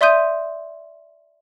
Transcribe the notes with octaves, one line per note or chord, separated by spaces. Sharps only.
D5 E5 C6 D#6 G6 D#7